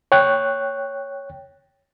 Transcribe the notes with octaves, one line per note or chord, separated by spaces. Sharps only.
C#5 G5 F#6